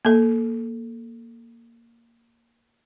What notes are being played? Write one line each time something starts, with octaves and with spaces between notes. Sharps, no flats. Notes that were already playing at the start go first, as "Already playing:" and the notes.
A#3 A4